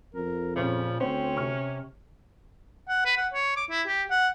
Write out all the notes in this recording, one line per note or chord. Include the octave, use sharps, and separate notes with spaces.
F2 A#4
A#2 C#3 F3 C#4
D2 C4 C#4 C5
C3 C#6 F6
F#5
B4
F#5
C#5
D6
E4
G4
F#5